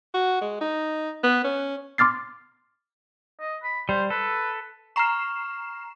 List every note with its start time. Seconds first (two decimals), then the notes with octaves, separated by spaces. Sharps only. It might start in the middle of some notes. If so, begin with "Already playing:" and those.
0.14 F#4
0.41 G#3
0.61 D#4
1.23 B3
1.44 C#4
1.98 C6 D6 F6 A6 C7
3.40 D#5
3.64 B5
3.89 G3 C5
4.10 A4 B4
4.96 A#5 C#6 F6 C7 E7